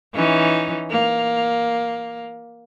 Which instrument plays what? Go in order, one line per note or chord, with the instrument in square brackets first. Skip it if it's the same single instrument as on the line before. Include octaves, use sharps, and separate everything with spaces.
[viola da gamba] E3 C#4 D#4
A#3